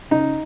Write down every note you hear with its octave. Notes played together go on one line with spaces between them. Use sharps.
C#3 D#4